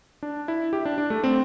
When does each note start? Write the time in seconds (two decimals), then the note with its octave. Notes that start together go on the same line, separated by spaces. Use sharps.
0.23 D4
0.48 E4
0.73 G4
0.85 D4
0.98 D4
1.10 A3
1.24 C4